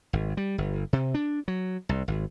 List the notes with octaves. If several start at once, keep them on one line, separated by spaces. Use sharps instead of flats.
G#1
G3
G1
C3
D4
F#3
C2
G#1